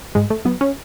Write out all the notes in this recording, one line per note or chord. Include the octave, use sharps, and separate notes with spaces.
G#2 G#3
A3
F#3 B3
C#4